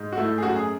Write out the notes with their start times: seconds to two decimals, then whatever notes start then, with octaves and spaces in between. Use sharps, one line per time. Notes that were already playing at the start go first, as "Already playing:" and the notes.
Already playing: G#2
0.12 F#4
0.17 A3 E4
0.38 G#4
0.42 F#2 F#4
0.56 G#4